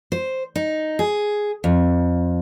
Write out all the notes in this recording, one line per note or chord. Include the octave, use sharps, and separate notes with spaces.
C5
D#4
G#4
F2